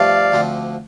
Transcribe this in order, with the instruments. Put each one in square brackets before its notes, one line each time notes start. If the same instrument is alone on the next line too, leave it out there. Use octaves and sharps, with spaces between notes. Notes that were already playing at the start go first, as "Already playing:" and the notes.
Already playing: [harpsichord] G2 F3 A3 [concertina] D5 F5
[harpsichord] D2 D3 F3 C4